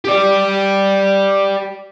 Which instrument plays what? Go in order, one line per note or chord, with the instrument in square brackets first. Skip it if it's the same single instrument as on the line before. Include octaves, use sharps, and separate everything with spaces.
[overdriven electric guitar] G4 D5